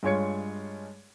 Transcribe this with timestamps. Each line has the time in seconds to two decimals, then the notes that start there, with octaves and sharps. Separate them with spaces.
0.03 G2 G#3 F4 C#5 G#6 C#7